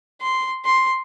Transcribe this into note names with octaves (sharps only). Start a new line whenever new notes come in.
C6
C6